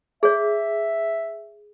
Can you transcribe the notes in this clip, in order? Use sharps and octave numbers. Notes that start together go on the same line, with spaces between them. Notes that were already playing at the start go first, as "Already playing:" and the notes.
G#4 C#5 E5